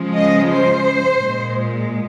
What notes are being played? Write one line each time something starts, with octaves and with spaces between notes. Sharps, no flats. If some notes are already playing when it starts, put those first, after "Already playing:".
Already playing: C#3 F3 G#3
D#5
C5
A#2 G#3